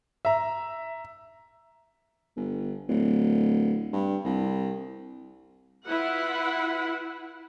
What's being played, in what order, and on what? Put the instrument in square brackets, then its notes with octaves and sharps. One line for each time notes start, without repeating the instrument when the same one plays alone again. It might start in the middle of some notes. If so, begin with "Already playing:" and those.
[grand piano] E5 A#5
[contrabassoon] G1
D1
G2
C2
[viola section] E4 F4 B4 F#5